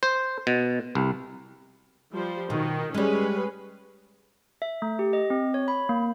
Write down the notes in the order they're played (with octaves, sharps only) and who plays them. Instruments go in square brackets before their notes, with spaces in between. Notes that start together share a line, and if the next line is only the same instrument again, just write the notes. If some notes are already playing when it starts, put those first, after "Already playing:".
[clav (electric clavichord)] C5
B2
C2
[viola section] F3 G3 C5
[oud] B2 [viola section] D#3
[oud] G3 G#3 [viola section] C#4 G#4 B4
[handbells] E5
A3
G4
D#5
C4
C#5
B5
A#3